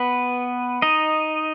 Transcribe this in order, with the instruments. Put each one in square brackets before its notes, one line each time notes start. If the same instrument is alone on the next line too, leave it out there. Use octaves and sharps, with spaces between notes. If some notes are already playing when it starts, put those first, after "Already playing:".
Already playing: [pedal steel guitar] B3 B4
D#4 D#5